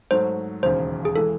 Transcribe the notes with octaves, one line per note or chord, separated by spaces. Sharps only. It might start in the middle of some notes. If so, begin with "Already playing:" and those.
G#2 F#3 A3 C5
E1 D#2 C#3 C5
G#4
E3 G#3 A4